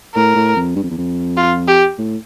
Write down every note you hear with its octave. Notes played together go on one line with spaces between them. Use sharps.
A2 A#4
A2
F2
G2
F2
E2
F2
F4
G4
A2